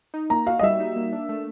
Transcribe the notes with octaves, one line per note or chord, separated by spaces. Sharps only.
D#4
A#3 A#5
F#4 F5
D#5
G3 E5
D#4
A#3
D4
A3